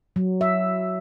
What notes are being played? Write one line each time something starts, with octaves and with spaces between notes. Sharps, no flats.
F#3
E5